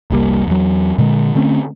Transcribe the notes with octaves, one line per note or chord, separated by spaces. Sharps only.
F1 C2 G3 A#3
E2 F#3
A#2 D3 G#3
D3 A3 C4 C#4